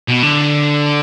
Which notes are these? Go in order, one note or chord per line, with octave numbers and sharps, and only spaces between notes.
B2
D3